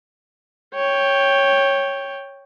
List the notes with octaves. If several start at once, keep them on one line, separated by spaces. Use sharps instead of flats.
C#5 G5